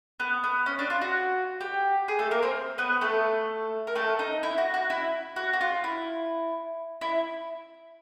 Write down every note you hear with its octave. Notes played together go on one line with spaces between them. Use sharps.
B3
B3
C#4
D4
F4
F#4
G4
G#4
A3 A4
A#3 A#4
C4 C5
B3 B4
A3 A4
A#4
A3 A4
D#4
E4
F#4
F#4
E4
F#4
F#4
F4
E4
E4